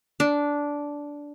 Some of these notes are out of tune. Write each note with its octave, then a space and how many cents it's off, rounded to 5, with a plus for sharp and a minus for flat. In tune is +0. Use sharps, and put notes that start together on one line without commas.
D4 -10